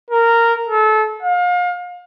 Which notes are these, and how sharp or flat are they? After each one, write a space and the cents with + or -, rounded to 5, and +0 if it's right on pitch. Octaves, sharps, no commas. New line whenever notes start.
A#4 -10
A4 -30
F5 +35